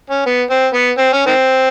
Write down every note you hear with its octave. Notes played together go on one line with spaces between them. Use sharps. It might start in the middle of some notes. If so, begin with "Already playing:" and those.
C#4
B3
C4
B3
C4
C#4
D#3 C4